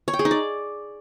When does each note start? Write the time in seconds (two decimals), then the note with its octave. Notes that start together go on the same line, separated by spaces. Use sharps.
0.08 C#5
0.13 G5
0.19 G#4
0.25 D#4
0.31 D5